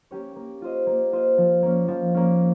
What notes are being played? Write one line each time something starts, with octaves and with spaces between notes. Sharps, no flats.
A#3 C#4 G4 C#5
A#3
F4 C5 D#5
A#3
F4 C5 D#5
F3
A#3 C#4
F3
A#3 C#4